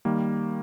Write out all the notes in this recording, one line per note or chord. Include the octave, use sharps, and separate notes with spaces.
D#3 G3 A#3